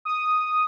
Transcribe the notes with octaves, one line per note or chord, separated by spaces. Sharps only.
D#6